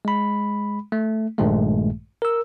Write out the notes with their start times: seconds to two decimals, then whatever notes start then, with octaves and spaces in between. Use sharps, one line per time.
0.05 G#3 B5
0.92 A3
1.38 A#1 G2 A#2 D#3 G#3 A3
2.22 A#4 E6